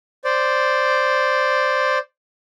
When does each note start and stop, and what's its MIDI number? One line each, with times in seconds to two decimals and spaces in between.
0.24 1.98 72
0.24 1.98 74